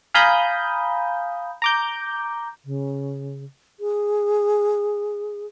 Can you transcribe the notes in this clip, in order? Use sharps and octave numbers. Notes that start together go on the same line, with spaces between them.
F5 G#5 A#5 B5 D#6 G6
A#5 D6 G6
C#3
G#4